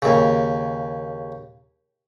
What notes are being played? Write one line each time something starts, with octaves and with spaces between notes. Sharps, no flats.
D#2 C#3